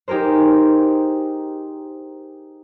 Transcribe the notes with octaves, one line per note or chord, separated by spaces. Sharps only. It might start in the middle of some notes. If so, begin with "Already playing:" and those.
D#4 G4 G#4 A#4 C5